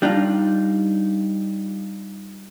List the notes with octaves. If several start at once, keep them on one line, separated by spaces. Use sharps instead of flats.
G3 D4 D#4 F4